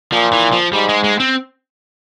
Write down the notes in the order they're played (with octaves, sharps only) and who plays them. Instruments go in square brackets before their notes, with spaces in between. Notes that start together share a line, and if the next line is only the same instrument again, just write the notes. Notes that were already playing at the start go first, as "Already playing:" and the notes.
[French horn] A#2 [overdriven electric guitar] F3
[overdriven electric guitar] E3
F3
[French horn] G#2 [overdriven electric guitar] G3
[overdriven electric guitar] G#3
G#3
C4